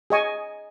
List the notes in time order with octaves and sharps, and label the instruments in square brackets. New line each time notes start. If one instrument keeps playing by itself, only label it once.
[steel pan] G#4 D#5 G#5 C#6